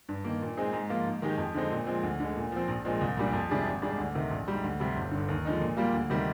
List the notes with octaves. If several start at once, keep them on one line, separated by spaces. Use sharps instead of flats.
G2
D#3 A#3
A#2
G#3 C4 D#4 G#4
G#2
F3 A#3 F4
G#2
D#3 G#3 D#4 G4
F2
D3 G#3 C4 D#4
A#2
F3 G#3 C4
D2
D3 G#3
A#2
F3 C4
A#1
A#2 F3 G#3 C4
C2
A#2 G3 D4
F2
C3 G3 D4 G#4
G#1
G#2 G3 D4 G#4
D2
C3 D#3
A#1
G#2 G3
D2
C3 G3
G1
G2 D3
D#2
D3 F3 G#3 D#4
A#2
G3 A#3 F4
D2
C3 D#3 G3